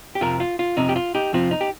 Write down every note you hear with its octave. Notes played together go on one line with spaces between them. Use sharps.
G4
F2 C3 F3 C4 F4 A#4
F4
F4
F2 C3 F3 C4 D#4
G4
F4
D#4 G4
F2 C3 F3 C4 F4
D#4
G4